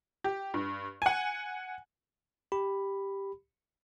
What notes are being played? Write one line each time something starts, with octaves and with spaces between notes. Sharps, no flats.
G4
G2
F#5 G#5
G4 B5